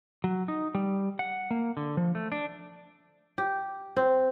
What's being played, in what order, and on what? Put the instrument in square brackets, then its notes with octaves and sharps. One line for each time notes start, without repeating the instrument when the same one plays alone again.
[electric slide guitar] F#3
D#4
G3
F#5
A#3
D3
F3
A3
D4
[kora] G4
C4